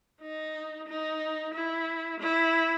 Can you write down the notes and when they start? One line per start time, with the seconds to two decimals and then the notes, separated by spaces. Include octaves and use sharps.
0.21 D#4
0.88 D#4
1.54 E4
2.20 E4